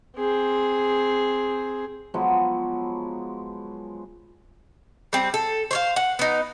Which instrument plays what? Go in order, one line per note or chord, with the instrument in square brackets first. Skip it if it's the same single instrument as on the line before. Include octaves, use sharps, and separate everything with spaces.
[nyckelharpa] C4 G#4
[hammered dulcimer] F3 F#3 G#3 B3
[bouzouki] G3 C4
A4
C5 C#5 F5
F#5
B3 D#4